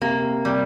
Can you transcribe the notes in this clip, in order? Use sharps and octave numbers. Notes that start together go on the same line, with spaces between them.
C3 A#3
C3 G3